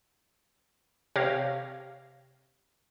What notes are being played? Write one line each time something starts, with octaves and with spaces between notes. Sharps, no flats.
C3 G4 C#5 F5 G#6 A#6